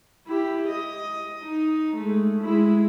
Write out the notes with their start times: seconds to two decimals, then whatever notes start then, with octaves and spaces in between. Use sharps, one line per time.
0.27 E4 G4
0.67 D#5
1.44 D#4
1.96 G#3 A3
2.43 G#3 E4